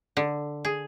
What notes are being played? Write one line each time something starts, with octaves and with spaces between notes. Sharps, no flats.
D3
G#4